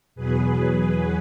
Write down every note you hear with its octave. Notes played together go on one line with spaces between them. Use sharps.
E2 B2 F#3 G#4 B4